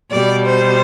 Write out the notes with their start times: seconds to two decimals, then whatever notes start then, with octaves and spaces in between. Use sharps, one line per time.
0.11 B2 G3 D5
0.45 C5